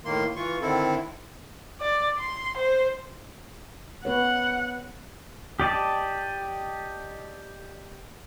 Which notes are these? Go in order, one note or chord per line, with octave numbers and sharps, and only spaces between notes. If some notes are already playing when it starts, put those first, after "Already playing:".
A2 D#3 A#3 C6
E3 F4 C#6
D3 D#3 C4 E4 A4
D5
C6
C5
B3 B4 C#5 F#5
G4 D5 D#5 A5